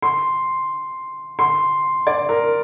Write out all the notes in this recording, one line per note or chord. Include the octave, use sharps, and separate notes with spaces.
C6
C6
D5
A#4